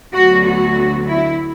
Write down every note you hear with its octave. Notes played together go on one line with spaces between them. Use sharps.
D2 D3 F#3 B3 F#4
F#4
E4